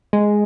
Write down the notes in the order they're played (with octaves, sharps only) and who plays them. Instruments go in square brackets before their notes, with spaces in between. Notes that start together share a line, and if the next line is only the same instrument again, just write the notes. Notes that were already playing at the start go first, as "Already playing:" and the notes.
[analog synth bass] G#3